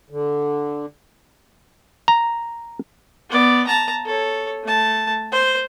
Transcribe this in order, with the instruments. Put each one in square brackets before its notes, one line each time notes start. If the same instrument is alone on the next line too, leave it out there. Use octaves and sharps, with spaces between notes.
[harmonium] D3
[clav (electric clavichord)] A#5
[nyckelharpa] B3 D5
A5 A#5
A4 C#5
A3 A5
C5